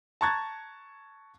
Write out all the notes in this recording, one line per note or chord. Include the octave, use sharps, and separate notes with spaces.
A5 A#5 C#6 F#6 G#6 A6